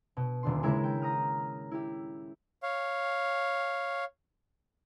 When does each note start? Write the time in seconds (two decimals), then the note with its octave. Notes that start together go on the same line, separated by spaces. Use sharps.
0.17 B2
0.43 D#1 A#2 D3 D4 C6
0.63 C#3 G#3 E4 A#4 E5 G#5
0.84 G5
1.02 A#5 D#6 F6
1.71 E4 G4
2.63 C#5 F5